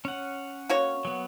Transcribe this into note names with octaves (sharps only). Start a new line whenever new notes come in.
C#4 F#5
A#3 F#4 C#5
F#3 B3